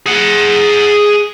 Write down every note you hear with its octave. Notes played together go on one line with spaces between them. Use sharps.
G#4 F#5